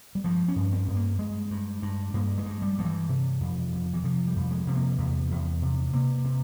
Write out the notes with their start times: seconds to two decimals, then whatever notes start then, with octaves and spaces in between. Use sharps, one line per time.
0.15 G3
0.24 G2 F3
0.48 C#4
0.56 G2
0.73 C4
0.88 G2
0.96 A#3
1.19 G2 G#3
1.51 G2
1.82 G2
2.14 G2 A#3
2.38 G#3
2.45 G2
2.62 G3
2.78 G2 F3
2.85 E3
3.09 C3
3.41 F2
3.73 F2
3.94 E3
4.04 C3 F3
4.27 G3
4.36 F2
4.51 G#3
4.67 C3
4.75 A#3
4.98 E2
5.31 E2
5.62 C3
5.93 C3 A#3
6.24 C3